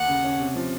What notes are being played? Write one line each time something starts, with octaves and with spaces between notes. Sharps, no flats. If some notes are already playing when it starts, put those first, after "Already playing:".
Already playing: D#2 F#5
C#3
C#4
C3
F3